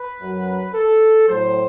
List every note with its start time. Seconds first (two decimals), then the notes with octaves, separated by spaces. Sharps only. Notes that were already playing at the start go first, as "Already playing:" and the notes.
Already playing: B4
0.20 F#2 F#3
0.74 A4
1.28 A2 F#3 C5